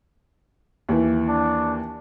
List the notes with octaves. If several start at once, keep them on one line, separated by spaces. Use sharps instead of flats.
D#2 E3
D4